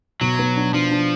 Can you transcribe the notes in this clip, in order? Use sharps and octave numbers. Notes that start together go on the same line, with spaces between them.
B2 F#3
B3
D4
F3 D4
D4